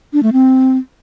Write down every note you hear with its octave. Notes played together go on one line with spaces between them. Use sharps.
D4
A3
C4